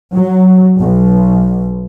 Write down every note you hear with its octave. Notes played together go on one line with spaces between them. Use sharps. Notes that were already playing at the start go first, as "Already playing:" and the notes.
F#3
B1